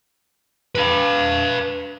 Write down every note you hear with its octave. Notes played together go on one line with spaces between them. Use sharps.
B4 F5